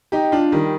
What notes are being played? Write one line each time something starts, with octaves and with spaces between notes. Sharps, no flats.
D#4 G4
D4 F4
D#3 G3